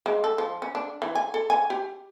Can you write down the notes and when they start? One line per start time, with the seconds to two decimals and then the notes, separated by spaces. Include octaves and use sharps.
0.06 G#3
0.24 A4
0.38 F3
0.62 C#4
0.75 D4
1.02 E3
1.15 G#5
1.34 A4
1.50 G#5
1.70 G4